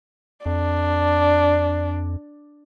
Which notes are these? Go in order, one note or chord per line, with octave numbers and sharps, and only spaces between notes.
F2 D4